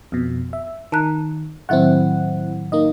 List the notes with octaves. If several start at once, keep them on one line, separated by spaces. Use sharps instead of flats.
F2 B2
E5
D#3 A5 A#5 F#6
A2 D#3 F#3 C4 E4 F#5
A#3 D#4 D#5